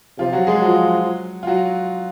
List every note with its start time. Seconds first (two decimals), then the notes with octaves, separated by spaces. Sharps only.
0.18 C3 F3 F4
0.33 F#3 F#4
0.47 G#3 G#4
0.61 F3 F#3 F#4
1.43 F4
1.47 F#3 F#4